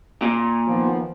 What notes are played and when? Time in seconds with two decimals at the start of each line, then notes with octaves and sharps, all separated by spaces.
0.22 A#2
0.68 D#3 F3 B3